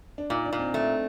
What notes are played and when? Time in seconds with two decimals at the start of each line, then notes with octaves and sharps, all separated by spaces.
0.18 D4
0.30 A#2 D#4
0.46 D4
0.53 A#2
0.59 C4
0.74 A3